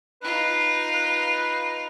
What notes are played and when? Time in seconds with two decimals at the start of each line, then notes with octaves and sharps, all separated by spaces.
0.22 D#4 F4 B4
0.94 B4